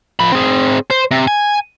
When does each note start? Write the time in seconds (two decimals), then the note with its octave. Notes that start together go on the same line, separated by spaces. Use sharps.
0.20 F3 B5
0.32 C4 G#4
0.91 C5
1.11 C3
1.28 G#5